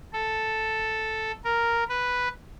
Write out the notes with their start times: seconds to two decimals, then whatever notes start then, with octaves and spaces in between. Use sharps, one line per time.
0.13 A4
1.44 A#4
1.88 B4